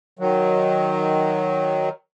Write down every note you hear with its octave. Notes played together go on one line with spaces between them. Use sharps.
D#3 F#3